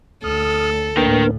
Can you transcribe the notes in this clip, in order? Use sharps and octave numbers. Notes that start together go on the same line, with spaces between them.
D2 A4 D#6 F6
D2 A2 A#3 D4 A#4 B4 G5